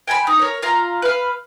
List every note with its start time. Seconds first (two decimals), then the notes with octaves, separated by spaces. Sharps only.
0.07 G5 G#5 A#5 B5
0.27 D#4
0.39 A#4 C#5
0.62 F4 F5 A#5
1.02 B4 F5